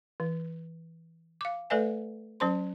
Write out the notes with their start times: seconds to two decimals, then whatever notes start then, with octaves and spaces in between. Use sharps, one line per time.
0.20 E3
1.41 F5 D6
1.70 A3 A4 B4 D5 E5 G#5
2.40 F#3 C#4 C5 C6